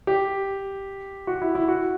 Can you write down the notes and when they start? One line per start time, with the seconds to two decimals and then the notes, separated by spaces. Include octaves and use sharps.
0.07 G4
1.27 F#4
1.42 E4
1.55 E4
1.68 F#4